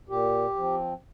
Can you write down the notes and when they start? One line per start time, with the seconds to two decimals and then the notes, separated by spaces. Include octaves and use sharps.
0.09 A#2 G4
0.56 F3 C4